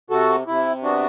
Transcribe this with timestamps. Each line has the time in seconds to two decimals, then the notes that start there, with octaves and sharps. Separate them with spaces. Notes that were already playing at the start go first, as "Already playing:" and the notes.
0.10 C3 F#4 A4
0.47 C3 E4
0.83 B3 D4 F#4